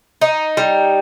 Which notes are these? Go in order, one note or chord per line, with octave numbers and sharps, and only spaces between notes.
D#4
G3